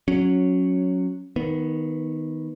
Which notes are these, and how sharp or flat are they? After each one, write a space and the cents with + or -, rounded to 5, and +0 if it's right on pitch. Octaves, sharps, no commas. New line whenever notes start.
F#3 -10 C#4 +0
D#3 +15 B3 +0